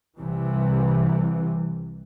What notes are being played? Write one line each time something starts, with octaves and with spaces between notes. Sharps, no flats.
C2 C3 E3